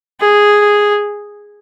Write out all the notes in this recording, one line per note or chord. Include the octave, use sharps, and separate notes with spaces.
G#4